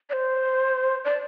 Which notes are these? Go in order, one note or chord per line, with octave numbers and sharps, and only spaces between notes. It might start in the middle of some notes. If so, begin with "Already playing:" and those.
D5
C5
D5